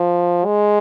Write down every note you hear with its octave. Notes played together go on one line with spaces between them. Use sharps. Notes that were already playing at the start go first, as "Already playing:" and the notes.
Already playing: F3
G#3